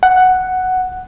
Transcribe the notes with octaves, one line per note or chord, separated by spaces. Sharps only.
F#5